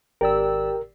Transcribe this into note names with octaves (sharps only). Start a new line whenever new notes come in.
G#1 G4 A#4 D5 E6